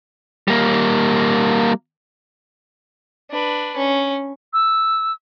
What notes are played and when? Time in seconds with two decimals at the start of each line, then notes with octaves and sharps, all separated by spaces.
0.48 G3 A#3
3.30 D4 B4
3.77 C#4
4.53 E6